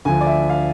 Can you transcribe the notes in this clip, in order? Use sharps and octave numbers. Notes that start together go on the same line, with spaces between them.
D2 D3 F3 G#5
D5
E5
F5